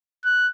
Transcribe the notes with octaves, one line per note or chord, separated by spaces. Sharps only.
F#6